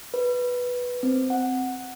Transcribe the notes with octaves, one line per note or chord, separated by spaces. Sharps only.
B4
C4
F#5